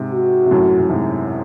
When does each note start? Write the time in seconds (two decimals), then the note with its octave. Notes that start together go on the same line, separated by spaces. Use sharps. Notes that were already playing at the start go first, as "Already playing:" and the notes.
Already playing: G#2 C3
0.13 F#4
0.46 C3
0.51 F#2 A2
0.80 A2
0.90 G#2 C3